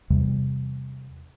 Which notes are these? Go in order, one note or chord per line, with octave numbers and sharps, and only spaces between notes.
E2 C3 G3